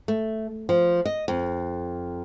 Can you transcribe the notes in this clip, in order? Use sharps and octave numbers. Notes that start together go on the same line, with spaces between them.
A3
F3
D#5
F2